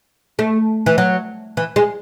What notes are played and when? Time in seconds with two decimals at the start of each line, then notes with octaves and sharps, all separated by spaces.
0.39 A3
0.86 E3
0.98 F#3
1.57 E3
1.76 G#3